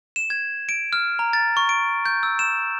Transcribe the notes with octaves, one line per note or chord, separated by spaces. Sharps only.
E7
G#6
D7
F6
A#5
A6
C#6
D7
G6
E6
E7